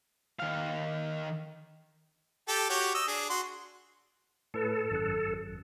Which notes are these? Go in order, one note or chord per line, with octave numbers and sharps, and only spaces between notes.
D#3 F5
G4 A4 G5
F#4 G4 C#5
D#5 E6
D4 G#4
F#4 C6
A2 A4 B4
G#1 F#2 F#6